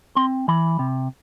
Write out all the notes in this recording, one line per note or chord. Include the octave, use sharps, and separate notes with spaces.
C4 C6
E3 B5
C3